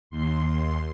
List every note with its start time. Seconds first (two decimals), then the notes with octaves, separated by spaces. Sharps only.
0.10 D#2 C6